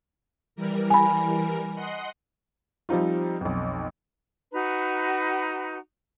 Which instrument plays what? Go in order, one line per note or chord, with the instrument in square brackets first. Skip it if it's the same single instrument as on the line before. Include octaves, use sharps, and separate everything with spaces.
[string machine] E3 G3 A#4
[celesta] G#5 B5
[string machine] D#5 F#5 C6
[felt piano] F3 G3 C4 D#4 F4
B1 F2
[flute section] D#4 F#4 B4 A#5